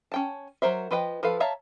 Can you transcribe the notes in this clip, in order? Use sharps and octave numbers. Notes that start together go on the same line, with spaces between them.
C#4 G5 A5
F#3 A#4 C5 E5
F3 B4 D#5 G5
F3 A4 B4 F5
C#5 E5 F5 A5 A#5